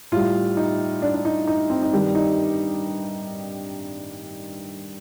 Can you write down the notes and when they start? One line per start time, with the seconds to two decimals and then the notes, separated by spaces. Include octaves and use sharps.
0.12 A2 G3 F4
0.57 D#4
1.02 D4
1.14 D4
1.25 D#4
1.47 D#4
1.70 C4
1.82 D#4
1.93 G2 D#3 G3 D4
2.15 D#4